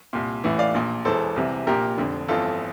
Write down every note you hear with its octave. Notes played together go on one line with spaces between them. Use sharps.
C2 A#2
A1 A2 E3
D5 F5
A#1 A#2
E1 E2 E3 A4 C5
C2 C3 E3
A#1 A#2 G4 A#4
F1 F2 D3
G1 F2 E3 F4 A4